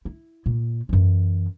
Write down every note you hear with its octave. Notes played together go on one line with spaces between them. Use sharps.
E4
A#2
F#2 E3